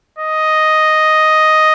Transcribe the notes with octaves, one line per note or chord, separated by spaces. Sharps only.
D#5